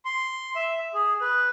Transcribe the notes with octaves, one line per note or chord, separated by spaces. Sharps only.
C6
E5
G#4
B4